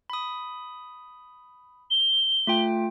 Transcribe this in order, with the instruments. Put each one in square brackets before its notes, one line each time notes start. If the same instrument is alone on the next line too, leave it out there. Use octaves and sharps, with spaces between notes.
[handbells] B5 D#6
[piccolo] G7
[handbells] A3 F4 G5